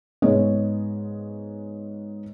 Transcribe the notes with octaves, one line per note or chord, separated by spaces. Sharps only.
G#2 G#3 B3 C#5 D#5